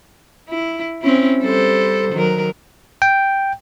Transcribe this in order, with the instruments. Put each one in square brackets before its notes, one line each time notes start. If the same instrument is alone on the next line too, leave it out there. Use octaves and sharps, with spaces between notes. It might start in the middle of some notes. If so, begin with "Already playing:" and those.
[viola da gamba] E4
C4 C#4 E4
G3 A4 C5
D#3 F#3 A#4
[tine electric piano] G5